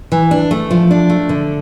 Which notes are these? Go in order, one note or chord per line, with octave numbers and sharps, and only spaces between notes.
E3
D4
A3
F3
D4
A3
D3